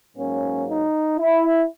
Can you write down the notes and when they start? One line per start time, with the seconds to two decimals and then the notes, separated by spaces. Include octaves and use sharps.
0.17 G#2 F#3 A#3 C#4
0.68 D#4
1.18 E4